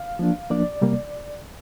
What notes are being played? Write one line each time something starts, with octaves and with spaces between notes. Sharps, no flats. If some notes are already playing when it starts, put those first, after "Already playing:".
Already playing: F5
F3 A#3 D4
F3 A#3 D4 D5
C3 G3 A#3